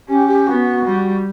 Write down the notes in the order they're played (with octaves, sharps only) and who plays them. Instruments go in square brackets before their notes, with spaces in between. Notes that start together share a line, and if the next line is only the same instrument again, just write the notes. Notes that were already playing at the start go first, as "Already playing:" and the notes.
[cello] C#4 [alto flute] G4
[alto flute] G4
[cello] B3 [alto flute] F#4
[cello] G3